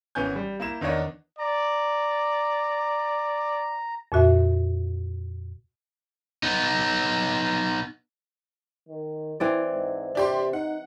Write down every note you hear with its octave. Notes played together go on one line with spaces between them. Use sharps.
G#1 E3 B3 C#4 G#5 G6
G3
A#3 E4 E7
E2 D#3 D4 C#5 D#5
D5 A#5
F2 A#2 F#4 E5
B3 D#4
D#3
E3 C4 E4 D5
G#2
C3 D4 G4 C6
D#4 F#5